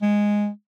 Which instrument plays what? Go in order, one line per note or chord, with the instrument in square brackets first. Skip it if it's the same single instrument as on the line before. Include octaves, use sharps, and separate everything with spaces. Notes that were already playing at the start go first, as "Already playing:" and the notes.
[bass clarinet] G#3